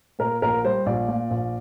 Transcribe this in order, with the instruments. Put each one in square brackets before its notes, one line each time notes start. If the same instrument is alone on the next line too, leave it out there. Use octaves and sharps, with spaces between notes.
[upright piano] A#2 A#4
A#1 A#4
G3 C5
A#1 D5
A#2
A#1